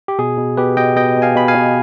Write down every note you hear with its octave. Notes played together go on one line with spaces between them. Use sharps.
G4
B2 G#4
B2
B2 G4 B4
B2 D#5 G5
B2 D#5 G5
B2
F5 G#5
B2 B5
F5 G#5
B2